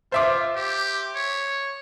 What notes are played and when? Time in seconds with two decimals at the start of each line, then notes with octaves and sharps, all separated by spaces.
0.12 F4 C5 E5 D6
0.56 G4
1.15 C#5